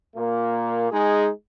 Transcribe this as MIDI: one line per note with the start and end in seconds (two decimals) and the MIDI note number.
0.16 0.91 46
0.16 0.91 58
0.91 1.29 56
0.91 1.29 63
0.91 1.29 68